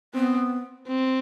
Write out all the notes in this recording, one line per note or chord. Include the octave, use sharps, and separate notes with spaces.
B3 C4
C4